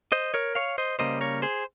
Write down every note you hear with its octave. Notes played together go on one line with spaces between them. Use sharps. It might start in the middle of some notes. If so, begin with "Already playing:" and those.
C5 D#5
A#4 C#5
C#5 F5
C5 D#5
C#3 G3 A#3 C5 D#5
A#4 C#5
G#4 C5